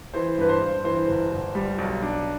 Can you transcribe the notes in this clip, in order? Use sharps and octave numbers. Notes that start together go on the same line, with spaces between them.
E3 C5
G2 B4
C5
G2
E3 C5
G1
G1
G3
B1
D4